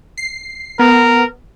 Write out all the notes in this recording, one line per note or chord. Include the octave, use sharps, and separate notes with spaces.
C7
B3 A#4